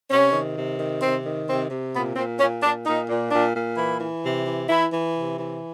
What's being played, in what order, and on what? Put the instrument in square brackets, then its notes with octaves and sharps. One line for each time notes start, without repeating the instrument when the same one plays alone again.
[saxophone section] C3 C#4
D#3
C3
D#3
C3 C4
D#3
C3 C4
C3
A#2 B3
A#2 C4
A#2 C#4
A#2 D4
A#2 D#4
A#2
A#2 D4
A#2
E3 E4
E3
C3
E3
E3 E4
E3
C3
E3